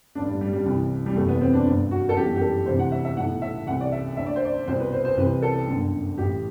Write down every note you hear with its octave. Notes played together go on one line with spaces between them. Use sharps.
A1 G2 D3 D4
G3
G3
G3
C2 C3 E3
G3
F#1 E2 C3 E3 A3
B3
C4
D4
G1 G2 D3
F#4
A4
G1 F#2 E3 G4
G4
A4
D2 C3 E3 C5
F#5
E5
E5
B1 A2 E3 F#5
E5
C2 C3 E3 F#5
D5
E5
D2 D3 E5
D5
C5
D5
C2 B2 C5
B4
C5
C5
C2 C3 E3 B4
A4
G1 F#2 D3
A1 A2 E3 G4